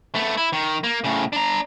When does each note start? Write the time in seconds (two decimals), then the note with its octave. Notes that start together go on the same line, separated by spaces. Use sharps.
0.15 A3 B3
0.38 E4
0.53 D#3
0.84 A#3
1.04 A2 C#3
1.33 D4 A#5